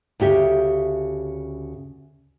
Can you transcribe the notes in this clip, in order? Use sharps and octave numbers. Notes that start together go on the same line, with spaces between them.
D2 C#3 G4 E5